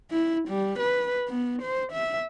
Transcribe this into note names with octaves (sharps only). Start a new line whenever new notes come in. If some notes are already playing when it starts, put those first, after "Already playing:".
E4
G3
B4
B3
C5
E5